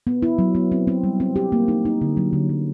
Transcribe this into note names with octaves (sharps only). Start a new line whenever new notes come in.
B3
E4
F#3
B3
C4
C4
G3
C4
G4
A#3
D#4
D#4
D3
F#3
D3
F#3